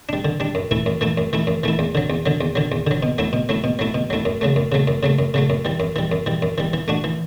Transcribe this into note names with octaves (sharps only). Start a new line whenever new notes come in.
G3 D4
D3
G3 D4
F#2
E3 A3 E4
F#2
E3 A3 E4
F#2
E3 A3 E4
F#2
E3 A3 E4
E2
D3 F#3
E2
D3 F#3
E2
D3 F#3
E2
D3 F#3
B2
F#3 A3 E4
B2
F#3 A3 E4
B2
F#3 A3 E4
B2
F#3 A3 E4
F#2
C#3 F#3 A3
F#2
C#3 F#3 A3
F#2
C#3 F#3 A3
F#2
C#3 F#3 A3
F#2
E3 G3
F#2
E3 G3
F#2
E3 G3
F#2
E3 G3
E3
A3 D4 F#4
E3